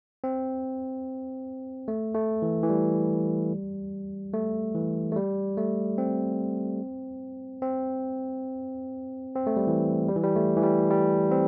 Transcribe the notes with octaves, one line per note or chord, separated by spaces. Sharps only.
C4
A3
A3
E3
E3
G3
A3
E3
A3
G3
A3
C4
C4
C4
A3
G3
E3
G3
E3
G3
A3
E3
G3
G3
C4